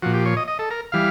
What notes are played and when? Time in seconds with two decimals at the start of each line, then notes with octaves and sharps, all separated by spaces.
0.02 A#2 F3 F#4
0.14 G4
0.25 C#5
0.37 D#5
0.48 D#5
0.59 A4
0.71 A#4
0.92 E3 G3 F5